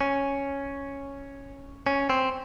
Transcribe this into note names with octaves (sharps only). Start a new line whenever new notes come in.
C#4
C#4
C4